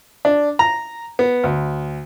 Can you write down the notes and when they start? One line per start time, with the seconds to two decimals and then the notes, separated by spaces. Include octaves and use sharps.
0.25 D4
0.59 A#5
1.19 B3
1.44 D2